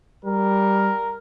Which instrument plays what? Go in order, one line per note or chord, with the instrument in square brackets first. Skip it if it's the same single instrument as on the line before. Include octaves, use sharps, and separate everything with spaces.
[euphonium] G3 [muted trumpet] A#4